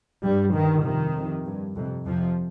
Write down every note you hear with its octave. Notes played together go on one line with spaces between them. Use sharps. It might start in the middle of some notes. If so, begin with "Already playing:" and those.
G2 G3
G2 D#3
F2 C3 D#3
F2 C3
G2
F2 C3
F2 C3 F3